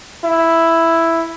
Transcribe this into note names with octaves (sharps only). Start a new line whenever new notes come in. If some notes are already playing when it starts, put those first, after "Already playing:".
E4